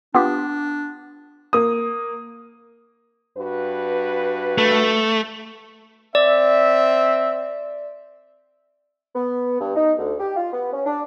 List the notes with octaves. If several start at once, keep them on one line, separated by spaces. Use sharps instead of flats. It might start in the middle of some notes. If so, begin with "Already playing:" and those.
B3 D4 F4 G4
A#3 D#6
G2 F#4 B4
A3
C4 D5 E5
B3
G2
D#4
D2
G4
F4
B3
C#4
D4